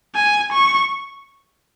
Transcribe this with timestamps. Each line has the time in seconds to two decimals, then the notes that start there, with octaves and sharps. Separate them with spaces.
0.15 G#5
0.52 C#6